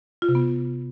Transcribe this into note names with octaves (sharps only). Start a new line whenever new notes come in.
F4
C3
B3